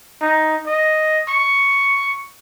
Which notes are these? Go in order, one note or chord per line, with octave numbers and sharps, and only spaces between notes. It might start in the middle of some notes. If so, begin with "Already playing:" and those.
D#4
D#5
C#6